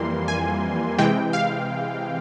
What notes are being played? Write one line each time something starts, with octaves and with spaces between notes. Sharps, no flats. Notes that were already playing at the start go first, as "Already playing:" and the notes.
Already playing: F2 E3 G3 A#3 C6
G#5
C3 E3 G#3 G5
F5